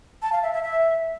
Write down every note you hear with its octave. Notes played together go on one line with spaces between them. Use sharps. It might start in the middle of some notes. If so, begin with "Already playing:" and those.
A5
F5
E5
E5
E5